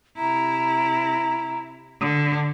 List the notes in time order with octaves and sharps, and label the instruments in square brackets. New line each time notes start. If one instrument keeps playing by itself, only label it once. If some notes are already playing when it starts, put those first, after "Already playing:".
[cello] C3 E4 [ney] A#5
[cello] D3